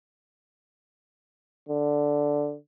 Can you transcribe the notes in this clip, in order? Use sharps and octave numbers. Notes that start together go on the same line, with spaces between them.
D3